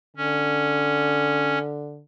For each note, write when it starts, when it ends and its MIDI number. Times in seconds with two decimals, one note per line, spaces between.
0.17 2.02 50
0.17 1.59 61